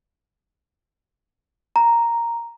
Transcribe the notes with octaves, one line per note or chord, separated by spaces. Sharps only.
A#5